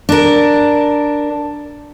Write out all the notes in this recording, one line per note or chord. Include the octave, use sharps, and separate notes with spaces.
D4 A#4